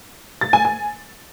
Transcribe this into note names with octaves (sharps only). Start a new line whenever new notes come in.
A6
G#5
G#5